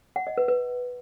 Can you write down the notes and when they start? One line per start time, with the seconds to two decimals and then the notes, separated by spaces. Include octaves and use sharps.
0.16 F#5
0.27 D#5
0.38 B4
0.48 B4